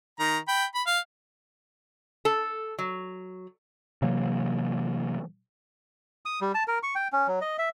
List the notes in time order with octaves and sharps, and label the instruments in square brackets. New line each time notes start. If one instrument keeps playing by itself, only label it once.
[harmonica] D#3 A#5
G5 B5
B5
F5
[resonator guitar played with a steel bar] A4
F#3
[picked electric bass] C3 E3 F#3 A#3
[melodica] D#6
G3
A5
A#4
C#6
G5
C#4
F#3
D#5
E5